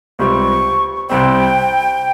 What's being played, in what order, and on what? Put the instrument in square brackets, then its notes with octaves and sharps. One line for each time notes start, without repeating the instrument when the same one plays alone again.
[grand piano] C#2 C3 G3 C4 G4 [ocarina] C#6
[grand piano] C2 C3 G3 C4 [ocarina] G5